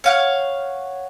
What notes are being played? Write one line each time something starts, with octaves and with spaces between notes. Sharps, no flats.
C#5 F5 F#5